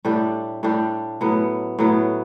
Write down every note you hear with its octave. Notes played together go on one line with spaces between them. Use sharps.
A2 G3 D4 G4
A2 G3 D4 G4
A2 F#3 B3
A2 F#3 B3